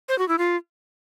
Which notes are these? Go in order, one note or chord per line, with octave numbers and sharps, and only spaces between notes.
C5
F#4
E4
F4